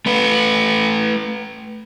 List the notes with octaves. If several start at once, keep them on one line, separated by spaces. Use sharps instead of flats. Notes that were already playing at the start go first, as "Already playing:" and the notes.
A3 B4